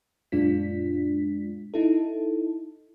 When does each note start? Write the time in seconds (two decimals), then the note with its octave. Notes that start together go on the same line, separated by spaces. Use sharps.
0.32 F#2 A#2 G#3 D4 F4 B6
1.74 D#4 E4 A4